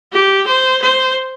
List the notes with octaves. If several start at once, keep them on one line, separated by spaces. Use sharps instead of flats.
G4
C5
C5